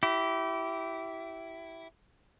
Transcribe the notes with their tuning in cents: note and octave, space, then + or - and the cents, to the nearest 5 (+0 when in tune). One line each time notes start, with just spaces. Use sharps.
E4 +0 G4 -25